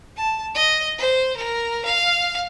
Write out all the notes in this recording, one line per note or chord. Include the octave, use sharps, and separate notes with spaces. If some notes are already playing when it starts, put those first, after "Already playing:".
A5
D#5
C5
A#4
F5